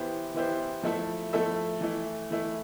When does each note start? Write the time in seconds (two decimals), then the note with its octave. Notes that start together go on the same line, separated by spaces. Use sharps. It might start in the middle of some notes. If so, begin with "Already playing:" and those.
Already playing: E3 B3 E4 G4 C5
0.34 E3 B3 E4 G4 C5
0.83 F3 A3 E4 A4 E5
1.33 F3 A3 E4 A4 E5
1.81 E3 A3 E4
2.30 E3 A3 E4